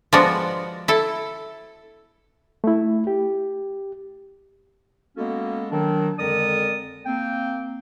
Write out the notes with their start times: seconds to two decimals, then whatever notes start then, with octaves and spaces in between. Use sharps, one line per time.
0.13 F3 G#3 B3 D4 F#4
0.88 E4 A4
2.64 A3 E4
3.07 G4
5.17 G#3 A#3 B3 C#4 F#4 A4
5.71 D#3 F#3 D4
6.19 F2 D3 G#3 A#4 D5 D#6
7.06 A#3 C4 G5